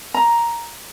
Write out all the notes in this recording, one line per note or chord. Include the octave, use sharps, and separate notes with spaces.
A#5